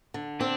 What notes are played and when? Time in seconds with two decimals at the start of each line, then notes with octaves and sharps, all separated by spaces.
0.14 D3
0.40 C4 D4